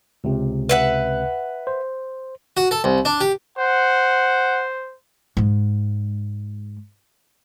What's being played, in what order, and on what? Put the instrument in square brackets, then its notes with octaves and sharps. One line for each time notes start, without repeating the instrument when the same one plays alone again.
[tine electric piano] C#2 C3
[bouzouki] B4 E5 F#5
[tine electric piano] C5
[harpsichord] F#4
A4
C2
D4
G4
[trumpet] C5 [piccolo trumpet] F#5
[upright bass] G#2 G#3